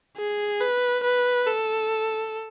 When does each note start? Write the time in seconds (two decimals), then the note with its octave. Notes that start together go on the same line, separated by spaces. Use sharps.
0.17 G#4
0.61 B4
1.04 B4
1.47 A4